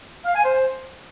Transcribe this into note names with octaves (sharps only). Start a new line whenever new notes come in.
F5
G#5
C5